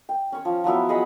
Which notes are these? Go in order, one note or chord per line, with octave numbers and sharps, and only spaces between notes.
G5
C#4 C#5
F3
F3 F#3 B3 E4
G#4 D#5 F#5 B5